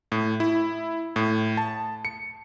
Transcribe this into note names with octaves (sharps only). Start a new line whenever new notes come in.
A2
E4
A2
A5
C#7